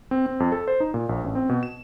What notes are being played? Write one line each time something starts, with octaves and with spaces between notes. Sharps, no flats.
C4
C4
F2
A4
C5
D#4
A#2
A#1
A1
C4
B2
E7